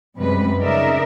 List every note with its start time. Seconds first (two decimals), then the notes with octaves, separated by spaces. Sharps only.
0.17 F#2 C3 G3 G#3 B4
0.59 C#3 D#4 A#4 D5 E5